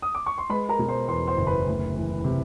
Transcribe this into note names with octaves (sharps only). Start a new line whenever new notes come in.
D#6
D6
C#6
C6
G#3 B4 B5
A#4 A#5
B2
C5 C6
E2 C5 C6
C5 C6
F#1
B4 B5
D2
E3
C3